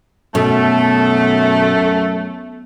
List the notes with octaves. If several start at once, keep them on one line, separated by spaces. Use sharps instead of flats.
F#2 B2 A3